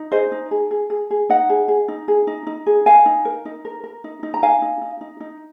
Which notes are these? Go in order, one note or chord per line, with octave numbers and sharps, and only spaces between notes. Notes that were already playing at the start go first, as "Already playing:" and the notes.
Already playing: D#4
G#4 C5 D#5
D#4
G#4
G#4
G#4
G#4
D#4 D#5 F#5
G#4
G#4
D#4
G#4
D#4
D#4
G#4
A#4 F5 G#5
D#4
A#4
D#4
A#4
A#4
D#4
D#4
A#5
D#4 F5 G#5
D#4
D#4
D#4
D#4